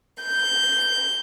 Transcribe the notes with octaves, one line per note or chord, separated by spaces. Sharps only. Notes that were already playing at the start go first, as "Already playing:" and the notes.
G6